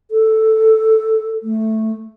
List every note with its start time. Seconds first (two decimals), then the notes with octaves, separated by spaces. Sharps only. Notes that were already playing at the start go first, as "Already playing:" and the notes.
0.11 A4
1.43 A3